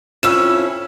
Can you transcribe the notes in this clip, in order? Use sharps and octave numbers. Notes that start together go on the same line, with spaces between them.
F2 C#4 E4 E6 E7